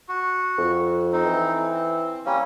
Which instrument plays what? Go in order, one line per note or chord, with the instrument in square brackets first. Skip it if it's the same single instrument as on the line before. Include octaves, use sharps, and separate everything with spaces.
[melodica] F#4
[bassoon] F2
[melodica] C4 D#4
[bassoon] E3
[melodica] C4
G3 A#3 C#4